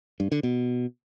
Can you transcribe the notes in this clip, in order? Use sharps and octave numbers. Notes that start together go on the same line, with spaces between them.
G2
D3
B2